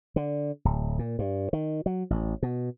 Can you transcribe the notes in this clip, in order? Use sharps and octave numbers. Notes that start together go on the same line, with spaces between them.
D3
D1
A#2
G2
D#3
F#3
A1
B2